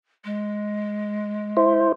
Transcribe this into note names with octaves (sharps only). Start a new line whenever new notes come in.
G#3
E4 C5